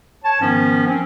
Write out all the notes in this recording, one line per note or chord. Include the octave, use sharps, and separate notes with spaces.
C#5 A5
G#2 D#3 F3 B3 C#4
F3 C4 C#4